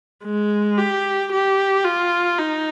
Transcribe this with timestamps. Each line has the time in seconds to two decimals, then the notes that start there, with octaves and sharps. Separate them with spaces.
0.25 G#3
0.78 G4
1.32 G4
1.85 F4
2.38 D#4